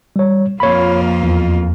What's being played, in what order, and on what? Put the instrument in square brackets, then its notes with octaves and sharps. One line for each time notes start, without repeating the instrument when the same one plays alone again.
[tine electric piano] G3 C#5
[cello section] F2 A#3 F4 [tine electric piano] C#5 B5
[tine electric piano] E2